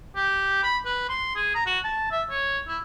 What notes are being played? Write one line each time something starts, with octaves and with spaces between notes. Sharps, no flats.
G4
B5
B4
C6
G#4
A#5
F#4
A5
E5
C#5
E4